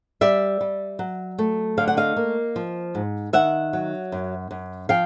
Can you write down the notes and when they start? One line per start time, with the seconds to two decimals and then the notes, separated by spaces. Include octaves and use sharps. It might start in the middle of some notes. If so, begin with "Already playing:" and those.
0.21 G3 D5 E5
0.61 G3
0.99 F#3
1.38 A3
1.77 D3 F5
1.88 F#5
1.97 D#5 F5
2.16 A#3
2.56 F3
2.95 G#2
3.33 D#3 E5 F#5
3.73 F#3
4.12 F#2
4.51 F#2
4.89 F3 F5 G5